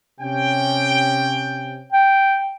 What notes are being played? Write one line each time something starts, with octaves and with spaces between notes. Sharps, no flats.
C3 C#4 G5
G5